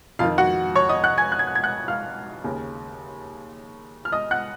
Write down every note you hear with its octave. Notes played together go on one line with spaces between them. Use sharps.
F2 D#3 F4 F5
F#4 F#5
C#5 C#6
D#5 D#6
F#5 F#6
G#5 G#6
F#6
G#6
F#6
G#6
F#5 F#6
F5 F6
D#2 C#3
F6
D#5 D#6
F#5 F#6